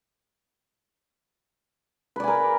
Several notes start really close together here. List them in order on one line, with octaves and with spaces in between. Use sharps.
B4 D5 G#5 A#4